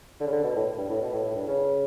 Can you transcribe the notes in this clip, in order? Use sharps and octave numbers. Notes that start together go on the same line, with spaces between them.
D3
C#3
D3
B2
A2
G2
A2
B2
A2
A2
G2
C#3